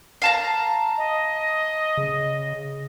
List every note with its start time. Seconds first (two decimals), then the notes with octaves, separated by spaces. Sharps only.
0.22 F5 A5 A#5
0.98 D#5
1.97 C#3